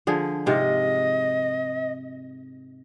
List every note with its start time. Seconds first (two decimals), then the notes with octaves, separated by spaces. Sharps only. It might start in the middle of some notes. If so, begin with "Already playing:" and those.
0.07 D3 F3 G#4
0.46 G#2 C3 F4 D#5